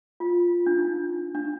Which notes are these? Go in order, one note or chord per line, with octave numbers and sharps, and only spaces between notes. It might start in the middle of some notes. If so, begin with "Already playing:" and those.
F4
D4
D#4
D4